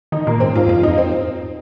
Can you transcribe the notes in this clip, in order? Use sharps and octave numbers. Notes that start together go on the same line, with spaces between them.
D#3 D#4
A#2 A#3
G#2 C4
G#2 F4
F2 F4
G#2
F2 D#4
C4